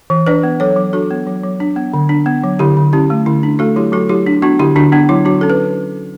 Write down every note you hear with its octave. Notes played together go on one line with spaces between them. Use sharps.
E3
D4 B4 D5
B3
F#3 A4 C#5
F#3
D4 F#4 A4
B3
F#3
F#3
D4
B3
D3
D4
B3
F#3
D3 E4 G4
D3
C#4 E4 G4
A3
D3 E4
D4
A3 F#4 A4
F#3 E4 G4
F#3 F#4 A4
F#3 E4 G4
D4
B3 D4 F#4
D3 E4 G4
D3 D4 F#4
B3 D4
F#3 E4
F#3 D4 F#4
C#4 A4
B4